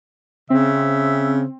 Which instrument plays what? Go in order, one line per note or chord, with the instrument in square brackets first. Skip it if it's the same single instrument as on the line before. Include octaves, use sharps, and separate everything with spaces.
[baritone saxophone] C#3 [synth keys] C4 [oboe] E5